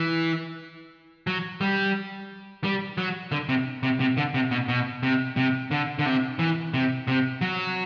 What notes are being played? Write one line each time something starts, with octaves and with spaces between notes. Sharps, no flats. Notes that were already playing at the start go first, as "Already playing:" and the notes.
Already playing: E3
F#3
G3
G3
F#3
D3
C3
C3
C3
D3
C3
B2
B2
C3
C3
D3
D3
C3
E3
C3
C3
F#3